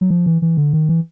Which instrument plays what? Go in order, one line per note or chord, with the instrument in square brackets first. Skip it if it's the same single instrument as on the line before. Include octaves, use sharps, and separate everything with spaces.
[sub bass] F#3
F3
E3
E3
D3
D#3
E3